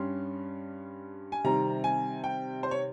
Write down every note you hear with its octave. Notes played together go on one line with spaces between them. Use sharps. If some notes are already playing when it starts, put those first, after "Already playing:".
Already playing: G2 G3 C#4 C6
G#5
C3 D#3 G3 C4 A#5
G#5
G5
C5
C#5